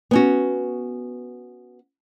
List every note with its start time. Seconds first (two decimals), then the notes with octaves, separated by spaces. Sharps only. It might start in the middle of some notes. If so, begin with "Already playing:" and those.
0.11 B3 C#4 F#4